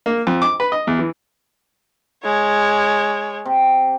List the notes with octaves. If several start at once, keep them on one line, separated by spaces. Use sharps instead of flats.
A#3
F2
D6
B4
D#5
E2
E3
G#3 C#5
C3